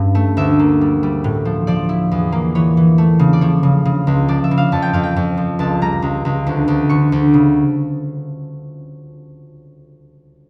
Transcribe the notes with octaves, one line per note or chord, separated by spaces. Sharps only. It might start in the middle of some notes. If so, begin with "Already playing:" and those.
Already playing: G2 C#4
A3
D2 E5
A#3
G3
G3
A2
F3
F3 D5
E4
E2
A#3
E3 C#5
E3
A3
C#3
D5
F3 C#5
C#3
C#3
C#2
F3 D5
E5
C#3
F5
F2 A5
G5
F2 F5
G5
F2
F3
C#2 A5
G3 A#5
C#2
C#2
D2
D2
D3 C#6
D2
C#3